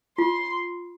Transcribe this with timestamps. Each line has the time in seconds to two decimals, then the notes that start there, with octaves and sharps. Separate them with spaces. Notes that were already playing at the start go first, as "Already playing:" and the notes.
0.18 F4 C6